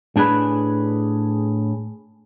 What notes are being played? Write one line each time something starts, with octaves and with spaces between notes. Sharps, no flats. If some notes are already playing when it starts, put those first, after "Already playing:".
A2 D4 G#4 B4 B5